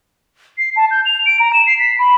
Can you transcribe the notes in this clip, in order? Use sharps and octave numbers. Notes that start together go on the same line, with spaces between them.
C7
A5
G6
F7
D7
A#5
E7
C7
B6
B5